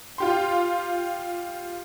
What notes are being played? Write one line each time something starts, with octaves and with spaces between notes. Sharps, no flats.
F4 G4 C6